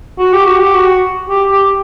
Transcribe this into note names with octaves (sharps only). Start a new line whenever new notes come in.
F#4
G4
F#4
G4
F#4
G4
G4